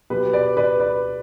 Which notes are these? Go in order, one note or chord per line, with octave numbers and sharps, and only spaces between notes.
B2 F#3 G4 B4
B4 D5
B4 D5
B4 D5